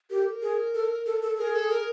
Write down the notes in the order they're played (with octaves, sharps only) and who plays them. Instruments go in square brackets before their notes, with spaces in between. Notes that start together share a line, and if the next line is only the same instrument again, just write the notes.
[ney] G4 [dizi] A#4
[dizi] A4
A#4
[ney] G#4
A4
A4
A4
[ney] G#4 [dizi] A#4
[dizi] A4
A#4